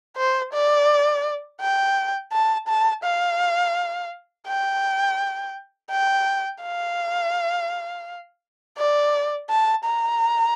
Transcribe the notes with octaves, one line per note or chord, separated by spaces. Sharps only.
C5
D5
G5
A5
A5
F5
G5
G5
F5
D5
A5
A#5